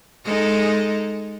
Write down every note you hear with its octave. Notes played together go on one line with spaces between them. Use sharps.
G#3 D#4 A4